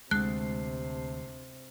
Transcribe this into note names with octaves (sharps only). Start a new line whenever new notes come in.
D2 C3 G#3 A5 F#6 C7